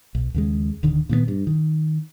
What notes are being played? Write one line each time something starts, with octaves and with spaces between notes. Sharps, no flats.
B1
D#2 C#3 G#3
D1 D3 D#3
A#2 D#3 A3 B3
G2
D#3